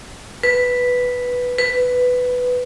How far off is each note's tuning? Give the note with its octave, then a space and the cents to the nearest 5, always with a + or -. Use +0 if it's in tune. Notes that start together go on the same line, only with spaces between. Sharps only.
B4 +0
B4 +10